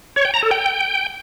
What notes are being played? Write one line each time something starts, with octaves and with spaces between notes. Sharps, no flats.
C#5
G5
A#5
A4
G5